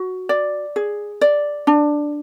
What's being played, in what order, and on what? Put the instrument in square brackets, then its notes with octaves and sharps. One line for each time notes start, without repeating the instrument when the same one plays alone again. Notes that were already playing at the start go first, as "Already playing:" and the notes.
Already playing: [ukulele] F#4
D5
G#4
D5
D4